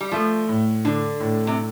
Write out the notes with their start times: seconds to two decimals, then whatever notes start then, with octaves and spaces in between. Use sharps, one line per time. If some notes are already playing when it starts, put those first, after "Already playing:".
0.01 G3
0.12 F3 A3
0.49 A2
0.85 D3 D4
1.20 A2
1.47 C3